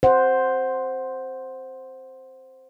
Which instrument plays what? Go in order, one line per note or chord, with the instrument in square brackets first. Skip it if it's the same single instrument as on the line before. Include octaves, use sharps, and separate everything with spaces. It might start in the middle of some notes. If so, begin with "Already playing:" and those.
[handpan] C5 F#5